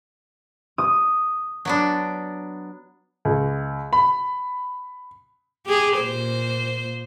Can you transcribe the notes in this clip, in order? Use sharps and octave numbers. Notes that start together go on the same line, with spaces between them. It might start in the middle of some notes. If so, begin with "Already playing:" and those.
D#6
F#3 B3 D4
C#2
B5
G4 G#4
A#2 C5